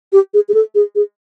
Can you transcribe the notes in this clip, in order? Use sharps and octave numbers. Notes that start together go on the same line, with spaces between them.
G4
G#4
G#4
A4
G#4
G#4